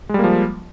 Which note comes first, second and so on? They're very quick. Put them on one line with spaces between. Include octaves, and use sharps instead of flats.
G#3 G3 A#3 F3